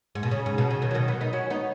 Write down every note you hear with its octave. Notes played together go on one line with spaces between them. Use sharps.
G#2
B2
C#3
G#2
B2
C#3
B2 D#3
F#3
B2 D#3
F#3 B3
B3 D#4
C#4 F#4
B3 D#4